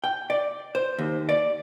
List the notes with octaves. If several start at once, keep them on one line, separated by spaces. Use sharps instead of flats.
G5
D5
C5
D#2
D5